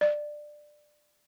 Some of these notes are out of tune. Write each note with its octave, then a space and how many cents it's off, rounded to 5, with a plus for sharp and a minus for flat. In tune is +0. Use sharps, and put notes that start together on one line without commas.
D5 +15